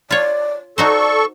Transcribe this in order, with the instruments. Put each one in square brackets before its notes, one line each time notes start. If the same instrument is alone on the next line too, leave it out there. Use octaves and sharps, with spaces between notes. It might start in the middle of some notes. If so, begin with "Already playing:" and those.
[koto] F4 C#5 [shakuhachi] D5
[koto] D#4 F#4 C5 [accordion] A4 C#6 [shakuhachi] D5